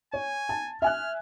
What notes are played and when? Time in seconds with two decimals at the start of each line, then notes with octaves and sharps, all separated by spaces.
0.13 C#5 G#5
0.49 A5
0.82 E5 G#5 F6 F#6